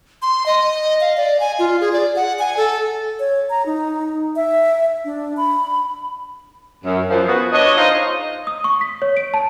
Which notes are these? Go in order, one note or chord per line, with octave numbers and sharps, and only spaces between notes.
C6
D#5
F5
D5
G#5
F4
G#4
D5
F#5
G#5
A4
C#5
A#5
D#4
E5
D4
B5
F#2
F#2 F3
B3 F#4 G#4 B4
D4 C#5 D#5
D#4 F4 G#4 C5 C#5 D#5
D#6
C#6
B6
C#5
D7
A5